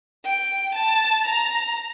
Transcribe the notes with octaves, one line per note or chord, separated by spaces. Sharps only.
G5
A5
A#5